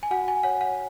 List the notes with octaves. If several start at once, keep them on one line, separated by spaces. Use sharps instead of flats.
G#5
F#4 F#5
G#5
C#5 F#5
F#5